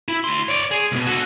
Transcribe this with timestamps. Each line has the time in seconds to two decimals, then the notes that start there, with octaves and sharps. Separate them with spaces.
0.08 E4
0.24 D2 C6
0.48 C#5 D5
0.71 G#4
0.92 C2 B2
1.06 F#4 A4